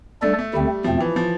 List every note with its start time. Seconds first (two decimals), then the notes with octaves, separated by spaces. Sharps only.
0.22 G3 A3 D4 A4 D5
0.39 A3
0.53 D2 D3 G3 A3 C4
0.84 E2 B2 F3 A3 C4
1.00 E3
1.16 F3